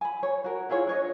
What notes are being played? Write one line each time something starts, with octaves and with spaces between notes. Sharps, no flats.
G#5 B5
C#5
F#4 A#4
E4 F4 G#4 C#5
D4 C#5 D#5